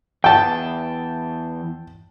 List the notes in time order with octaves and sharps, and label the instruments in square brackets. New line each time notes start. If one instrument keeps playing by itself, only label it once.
[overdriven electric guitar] E2 [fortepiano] G5 A5